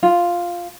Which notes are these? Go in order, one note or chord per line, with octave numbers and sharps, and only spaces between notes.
F4